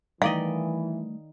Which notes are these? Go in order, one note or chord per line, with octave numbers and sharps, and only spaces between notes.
D#3 E3 G3 A3 D5 D#5 F5